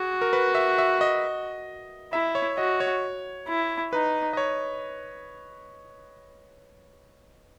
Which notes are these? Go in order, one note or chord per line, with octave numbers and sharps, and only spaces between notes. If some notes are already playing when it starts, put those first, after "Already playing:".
Already playing: F#4 G#4
A#4
B4
E5
E5
D#5
E4 E5
C#5
F#4 D#5
C#5
E4
D#4 B4
D#5
C#5